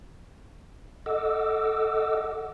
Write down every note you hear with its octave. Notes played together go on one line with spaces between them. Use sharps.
A4 D#5 F#5 D6 E6